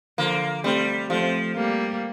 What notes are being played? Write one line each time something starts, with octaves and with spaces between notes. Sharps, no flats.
D3 F3 A#3
G3 A3 C4
F3 A3 C4
G3 A#3